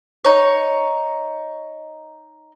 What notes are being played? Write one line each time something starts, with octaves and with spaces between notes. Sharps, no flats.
D#4 C#5